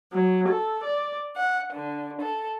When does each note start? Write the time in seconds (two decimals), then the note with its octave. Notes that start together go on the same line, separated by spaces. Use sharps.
0.13 F#3
0.48 A4
0.84 D5
1.35 F#5
1.72 D3
2.21 A4